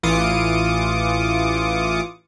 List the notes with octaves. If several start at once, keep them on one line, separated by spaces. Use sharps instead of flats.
A1 E3 F4 D6 D#6 C#7